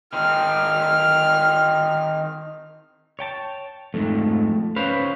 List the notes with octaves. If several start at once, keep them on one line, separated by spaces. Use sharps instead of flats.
D#3 C4 F6
C#5 G5 A5
F2 G#2 A3
C#4 B4 C5 F5